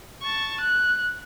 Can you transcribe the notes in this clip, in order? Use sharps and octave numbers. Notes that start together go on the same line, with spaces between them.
A5 C#6
F#6